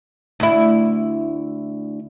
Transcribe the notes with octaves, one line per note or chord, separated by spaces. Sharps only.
D2 E4